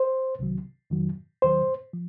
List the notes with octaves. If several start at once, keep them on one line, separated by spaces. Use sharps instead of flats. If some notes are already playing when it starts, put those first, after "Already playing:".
Already playing: C5
C2 C3 D#3 F#3
F2 D#3 F#3
D#2 D#3 F#3 C5
F3